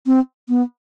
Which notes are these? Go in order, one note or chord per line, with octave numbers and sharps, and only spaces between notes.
C4
B3